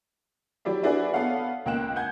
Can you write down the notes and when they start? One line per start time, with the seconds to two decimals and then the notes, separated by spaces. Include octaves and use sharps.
0.65 F#3 E4 G4 D5 E5
0.83 D4 E4 F#4 G#4 B4 D5
1.13 B3 A4 C#5 F5 F#5
1.66 C#2 A#3 G5 F#6 E7
1.96 F#5 G#5 G6 G#6